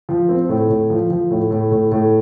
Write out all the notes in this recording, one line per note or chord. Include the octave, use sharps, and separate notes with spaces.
F3
C4
A2
A2
F3
F3
A2
A2
A2
A2